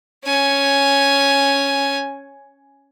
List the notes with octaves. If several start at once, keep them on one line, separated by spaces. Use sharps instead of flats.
C#4 G#5